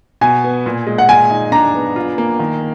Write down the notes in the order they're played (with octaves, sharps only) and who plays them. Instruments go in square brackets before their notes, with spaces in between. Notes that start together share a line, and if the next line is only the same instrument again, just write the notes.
[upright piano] B2 [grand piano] G#5
[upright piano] B3
A#2
G#3
[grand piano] F#5
[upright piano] A#2 [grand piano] G#5
[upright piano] D#4
[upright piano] D4 [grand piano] A#5
[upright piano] B3
F4
A#3
D#3